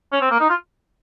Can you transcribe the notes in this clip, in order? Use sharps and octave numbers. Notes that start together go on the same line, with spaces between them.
C#4
C4
A#3
D#4
F4